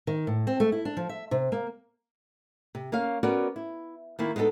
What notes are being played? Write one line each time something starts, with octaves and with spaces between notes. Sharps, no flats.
D#3
A2
C4
A3
E4
D4
F3
E5
C3
A#3
C3
A#3 C#4 F5
B3 C#4 F#4 A#4 D5
E4
D#3 A#3 E4
G#3 B3 D4 D#4 A4